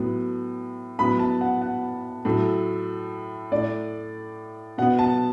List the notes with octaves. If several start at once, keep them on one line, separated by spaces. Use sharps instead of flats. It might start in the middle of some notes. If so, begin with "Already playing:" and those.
Already playing: A2 F#3 B3
A2 F#3 B3 B5
A5
F#5
F#5
A2 F#3 A3
A2 A3 D5
B2 B3 F#5
A5